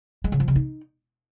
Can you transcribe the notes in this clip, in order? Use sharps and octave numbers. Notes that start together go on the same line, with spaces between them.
G#3
C#3
F3
C#3
D#4